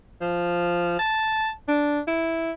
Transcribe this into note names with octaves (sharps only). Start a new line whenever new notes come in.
F3
A5
D4
E4